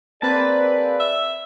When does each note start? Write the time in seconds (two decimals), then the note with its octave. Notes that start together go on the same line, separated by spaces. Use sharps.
0.22 A#3 C4 G#4 B4 D5 A5
1.00 E5